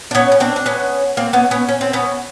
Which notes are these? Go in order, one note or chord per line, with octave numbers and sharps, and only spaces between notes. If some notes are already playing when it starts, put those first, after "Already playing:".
D4
B3 C#4
C#4
C4 D4
D4
B3 C#4
A#3 C4
B3 C#4
B3 C#4
C#4
C4
B3 C#4